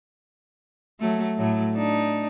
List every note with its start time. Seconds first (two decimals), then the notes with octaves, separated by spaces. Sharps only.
1.00 F#3 A3
1.38 A2 F#3 A3
1.76 D4 D#4